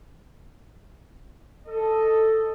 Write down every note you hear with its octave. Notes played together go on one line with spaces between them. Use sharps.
A4 D#5